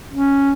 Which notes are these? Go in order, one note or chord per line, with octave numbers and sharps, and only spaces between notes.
C#4